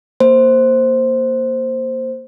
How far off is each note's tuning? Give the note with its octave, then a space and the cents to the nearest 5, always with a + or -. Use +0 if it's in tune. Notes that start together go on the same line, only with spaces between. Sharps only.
A#3 +0 C5 +0